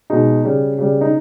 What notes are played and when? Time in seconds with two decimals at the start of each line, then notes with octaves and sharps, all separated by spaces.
0.10 B2 G#3 D#4
0.44 C#3 G3
0.79 C#3 G3
1.01 D#4